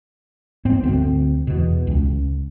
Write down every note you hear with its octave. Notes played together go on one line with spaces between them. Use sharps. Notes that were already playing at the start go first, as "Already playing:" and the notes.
G#2 B3 C4
D2 G#3 C4
E2 B2
C#2